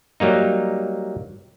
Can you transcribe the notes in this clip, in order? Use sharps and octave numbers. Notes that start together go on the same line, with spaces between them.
F#3 G3 A#3 D#4